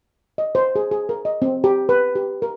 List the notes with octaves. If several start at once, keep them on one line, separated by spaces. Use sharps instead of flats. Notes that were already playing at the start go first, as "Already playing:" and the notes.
D#5
C5
G#4
G#4
A#4
D#5
C4
G4
B4
G4
A#4